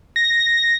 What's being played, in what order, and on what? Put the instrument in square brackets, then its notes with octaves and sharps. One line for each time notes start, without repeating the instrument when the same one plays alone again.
[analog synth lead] A#6